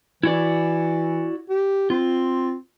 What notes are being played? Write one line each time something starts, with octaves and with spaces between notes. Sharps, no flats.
E3 E4 F#4 D5
G4
C4 F4